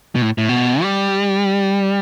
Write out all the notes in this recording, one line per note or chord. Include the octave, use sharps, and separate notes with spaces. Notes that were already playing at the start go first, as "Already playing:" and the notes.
B2
A2
A2
B2
G3